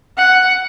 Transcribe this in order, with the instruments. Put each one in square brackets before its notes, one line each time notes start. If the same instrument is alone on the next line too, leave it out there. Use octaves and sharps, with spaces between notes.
[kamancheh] F#5